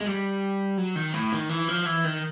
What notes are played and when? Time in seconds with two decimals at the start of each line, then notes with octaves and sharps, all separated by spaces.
0.01 G#3
0.06 G3
0.77 F#3
0.96 D#3
1.14 A2
1.33 D#3
1.49 E3
1.68 F3
1.85 E3
2.04 D#3